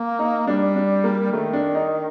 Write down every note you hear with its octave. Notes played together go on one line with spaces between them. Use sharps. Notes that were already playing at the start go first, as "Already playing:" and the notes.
Already playing: A#3
D#4
G3 D4
D4
A#3
D#3 A3
D4
D#4